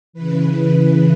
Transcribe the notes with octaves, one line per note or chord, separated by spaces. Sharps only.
C#3 E3 B4